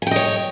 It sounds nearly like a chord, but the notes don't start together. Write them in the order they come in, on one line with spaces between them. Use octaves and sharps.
G#5 G5 D#5 C#5